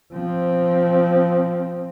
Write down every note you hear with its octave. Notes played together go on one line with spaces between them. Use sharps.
F3 C4